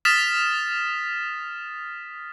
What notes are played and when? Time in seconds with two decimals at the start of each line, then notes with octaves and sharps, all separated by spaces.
0.05 D#6 F6 A6 B6 E7